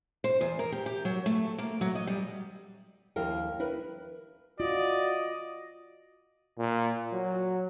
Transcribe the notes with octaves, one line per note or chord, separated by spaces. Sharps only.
C5
E2
A#4
G4
G4
F#3
A3
A#3
F#3
D#5
G3
D#2 F3 E4 A#4 G5
E4 A#4 B4
F4 F#4 D5 D#5
A#2
F#3